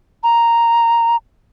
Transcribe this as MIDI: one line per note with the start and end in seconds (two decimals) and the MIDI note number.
0.24 1.16 82